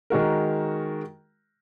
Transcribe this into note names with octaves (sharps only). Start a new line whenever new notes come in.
D#3 G#3 F#4 A#4